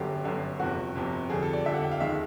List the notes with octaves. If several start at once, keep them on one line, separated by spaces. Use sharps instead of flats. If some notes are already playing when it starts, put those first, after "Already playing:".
Already playing: G1 F#2 D3 G4
G1 F#2 D3
G1 F2 C3 F#4
G1 F2 C3
F2 D3 G3 G#4
A4
D5
F2 D3 G3 E5
F#5
G5
F5
D#2 D#3 G#3 E5